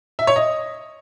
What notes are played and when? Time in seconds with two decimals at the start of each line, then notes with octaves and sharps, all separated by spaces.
0.19 E5
0.27 C#5
0.36 D#5